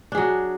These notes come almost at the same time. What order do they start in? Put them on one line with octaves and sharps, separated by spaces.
D4 G#4 F#3